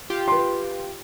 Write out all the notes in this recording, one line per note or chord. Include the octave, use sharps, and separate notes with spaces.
F4 G4
B4 C6